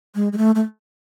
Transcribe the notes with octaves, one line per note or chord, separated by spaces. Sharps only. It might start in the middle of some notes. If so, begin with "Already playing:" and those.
G#3
G#3
A3
A3